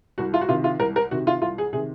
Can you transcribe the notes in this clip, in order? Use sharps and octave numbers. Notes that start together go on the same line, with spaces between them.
C2 F#4
F4
F#4
C3 D#3 F4
F4
C2 A#4
A#4
C3 D#3 F#4
F4
C2 F4
G#4
C3 D#3 G#4